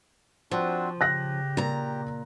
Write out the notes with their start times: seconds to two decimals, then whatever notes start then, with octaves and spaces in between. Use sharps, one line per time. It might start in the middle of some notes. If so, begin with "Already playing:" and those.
0.51 F3 C4 D4 F#4
1.01 C#3 G4 F#6 A#6
1.57 A#2 A#5